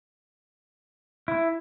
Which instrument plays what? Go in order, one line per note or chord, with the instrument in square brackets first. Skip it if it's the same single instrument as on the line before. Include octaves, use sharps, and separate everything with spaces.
[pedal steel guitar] E4